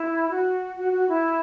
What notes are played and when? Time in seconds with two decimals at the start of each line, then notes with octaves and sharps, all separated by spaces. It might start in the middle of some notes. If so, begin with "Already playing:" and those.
Already playing: E4
0.30 F#4
0.77 F#4
0.93 F#4
1.08 E4